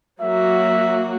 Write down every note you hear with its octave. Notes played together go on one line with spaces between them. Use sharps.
F#3 A#3 F#4 E5